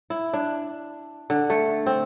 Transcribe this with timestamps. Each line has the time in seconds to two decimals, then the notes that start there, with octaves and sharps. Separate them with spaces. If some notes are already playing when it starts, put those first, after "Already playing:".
0.10 E4
0.33 D4
1.30 D3
1.50 A3
1.86 C4